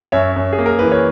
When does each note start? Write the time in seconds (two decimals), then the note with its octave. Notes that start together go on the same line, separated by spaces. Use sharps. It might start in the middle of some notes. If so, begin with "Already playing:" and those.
0.12 F#2 C#5 E5
0.36 F#2
0.53 G#4
0.59 A#3
0.66 A#4
0.79 E3 B4
0.92 C#5